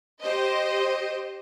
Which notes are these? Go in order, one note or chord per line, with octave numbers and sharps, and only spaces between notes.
G4 C5 D#5